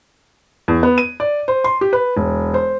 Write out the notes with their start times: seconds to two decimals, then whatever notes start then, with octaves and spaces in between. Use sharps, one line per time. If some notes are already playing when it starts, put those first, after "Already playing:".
0.68 E2
0.83 B3
0.98 D#7
1.20 D5
1.48 C5
1.64 C6
1.81 G4
1.93 B4
2.17 E1
2.54 C5